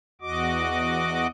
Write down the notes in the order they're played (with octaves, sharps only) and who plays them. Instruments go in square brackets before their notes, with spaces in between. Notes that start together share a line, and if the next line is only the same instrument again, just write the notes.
[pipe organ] E2 F#4 D#5 D6